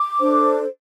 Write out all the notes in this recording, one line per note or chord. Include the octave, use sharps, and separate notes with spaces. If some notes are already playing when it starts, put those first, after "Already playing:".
Already playing: D6
D4 A4 C5